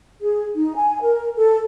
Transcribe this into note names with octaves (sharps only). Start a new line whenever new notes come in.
G#4
D#4
G#5
A#4
A4